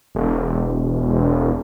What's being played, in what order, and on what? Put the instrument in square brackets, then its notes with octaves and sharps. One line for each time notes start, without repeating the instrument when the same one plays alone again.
[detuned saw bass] E1